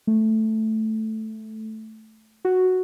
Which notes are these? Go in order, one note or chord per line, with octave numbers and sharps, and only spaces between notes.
A3
F#4